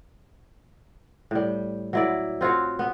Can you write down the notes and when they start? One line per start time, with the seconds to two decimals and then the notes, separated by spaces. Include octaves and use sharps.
1.31 A2 G3
1.93 F#3 E4 D5
2.41 C4 F4 F#4 C#5
2.79 B3